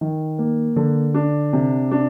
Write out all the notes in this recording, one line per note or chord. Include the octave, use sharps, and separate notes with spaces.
D#3
A#3
D3
D4
C3
D4